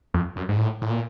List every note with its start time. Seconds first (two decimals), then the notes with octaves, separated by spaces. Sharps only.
0.14 F2
0.36 F#2
0.49 G#2
0.57 A2
0.82 A2
0.90 A#2